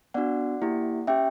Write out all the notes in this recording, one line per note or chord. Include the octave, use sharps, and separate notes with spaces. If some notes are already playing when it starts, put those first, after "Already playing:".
B3 D4 F#4 D5 F#5
A#3 E4 G4
C#4 G4 E5 G5